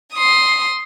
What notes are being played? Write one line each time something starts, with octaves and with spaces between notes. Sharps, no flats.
C6 D#6